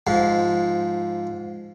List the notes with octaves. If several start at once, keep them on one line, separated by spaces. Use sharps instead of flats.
G#2 F3